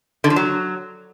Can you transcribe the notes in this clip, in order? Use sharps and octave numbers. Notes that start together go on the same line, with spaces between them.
D3
F3
F#3